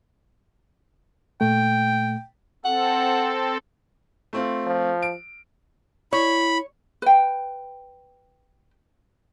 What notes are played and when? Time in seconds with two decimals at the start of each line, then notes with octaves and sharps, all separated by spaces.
1.41 A#2 A3 G5
2.65 C4 A4 F#5
4.33 A3 C4 F4
4.67 F3
5.02 D7
6.13 E4 C#5 B5
7.02 B4 G5